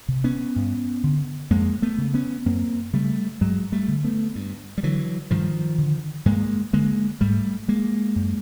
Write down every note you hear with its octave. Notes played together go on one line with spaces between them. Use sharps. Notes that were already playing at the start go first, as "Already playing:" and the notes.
C3
B3 C#4
G2
D3
F2 G#3 A#3
A3 B3
C#3
B3 C#4
F#2 A#3 C4
C#3 G3 A3
G2 F#3 G#3
G3 A3
D3
A3 B3
G2
G3
D3 E3 F#3
G2 D#3 F3
D3
G2 G#3 A#3
D3 G#3 A#3
G#2 G3 A3
G#3 A#3
F#2